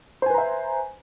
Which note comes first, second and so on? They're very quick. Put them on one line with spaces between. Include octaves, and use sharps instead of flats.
C5 G#5 B4 A#5 E5